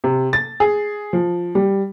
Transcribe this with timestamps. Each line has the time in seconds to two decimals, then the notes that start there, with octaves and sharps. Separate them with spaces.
0.04 C3
0.33 A6
0.60 G#4
1.13 F3
1.55 G3